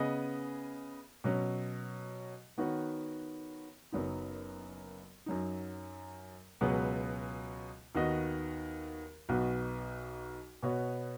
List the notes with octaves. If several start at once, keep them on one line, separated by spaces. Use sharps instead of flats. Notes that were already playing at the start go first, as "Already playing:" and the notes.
Already playing: C#3 B3 G#4 D#5
B2 F#3 C#4
D#3 B3 F#4 C#5
F#1 F#2 F#3 B3 D#4
F#2 F#3 D#4
C#2 B2 F#3 B3 G#4
D#2 D#3 B3 F#4 D#5
B1 B2 B3 F#4
B2 B3 F#4 C#5